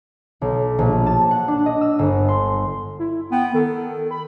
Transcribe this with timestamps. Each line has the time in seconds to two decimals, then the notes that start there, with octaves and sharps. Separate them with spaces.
0.41 B1
0.79 A#1
1.06 A5
1.31 F#5
1.48 D4
1.66 D#5
1.81 E6
1.99 G1
2.28 C6
2.99 E4
3.32 B3 G5
3.54 D#3 A4
3.81 A4
4.11 B5